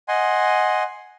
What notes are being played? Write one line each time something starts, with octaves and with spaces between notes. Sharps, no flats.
D#5 F#5 G#5 C6